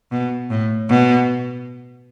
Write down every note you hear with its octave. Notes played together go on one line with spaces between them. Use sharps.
B2
A2
B2